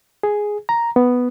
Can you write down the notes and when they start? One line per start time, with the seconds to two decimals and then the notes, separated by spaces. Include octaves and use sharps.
0.23 G#4
0.69 A#5
0.96 B3